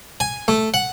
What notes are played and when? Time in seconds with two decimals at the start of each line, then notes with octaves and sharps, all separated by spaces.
0.20 G#5
0.48 A3
0.74 F#5